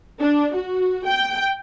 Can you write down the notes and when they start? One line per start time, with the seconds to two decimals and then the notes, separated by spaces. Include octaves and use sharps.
0.21 D4
0.55 F#4
1.07 G5